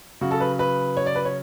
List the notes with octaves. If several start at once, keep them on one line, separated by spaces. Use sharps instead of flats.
C#3 F#3 F#4
A4
B4
B4
C#5
D5
B4
C#5